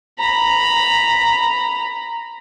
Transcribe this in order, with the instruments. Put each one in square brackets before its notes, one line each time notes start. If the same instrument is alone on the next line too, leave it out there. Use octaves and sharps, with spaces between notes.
[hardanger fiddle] A#5 B5